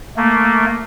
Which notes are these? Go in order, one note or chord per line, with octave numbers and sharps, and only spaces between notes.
A3 A#3